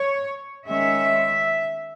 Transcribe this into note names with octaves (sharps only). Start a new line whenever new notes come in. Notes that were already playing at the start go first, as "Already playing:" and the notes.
Already playing: C#5
D#3 G#3 C#4 E5